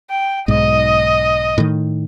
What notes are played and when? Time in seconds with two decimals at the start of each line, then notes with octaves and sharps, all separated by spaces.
0.10 G5
0.48 B1 G#2 D#5
1.58 A2 D#3